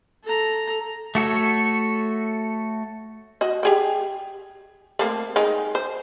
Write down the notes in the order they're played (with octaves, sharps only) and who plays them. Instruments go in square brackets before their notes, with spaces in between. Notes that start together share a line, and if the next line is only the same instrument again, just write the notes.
[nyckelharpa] A4 A#5
[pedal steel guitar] A3 F#4 A4 C#5
[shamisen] F#4 D#5
G4 G#4 G5
A3 A#3 C4
G#3 D#4 G5
C5